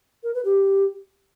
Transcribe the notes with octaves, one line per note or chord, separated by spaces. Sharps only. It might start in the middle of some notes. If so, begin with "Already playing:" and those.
A#4
B4
G4